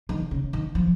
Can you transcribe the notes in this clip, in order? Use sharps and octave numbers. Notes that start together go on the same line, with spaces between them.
D#3
C#3
D#3
F3